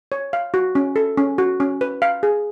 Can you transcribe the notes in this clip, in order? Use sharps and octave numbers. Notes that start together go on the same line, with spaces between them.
C#5
F5
F#4
C#4
A4
C#4
F#4
C#4
B4
F5
G#4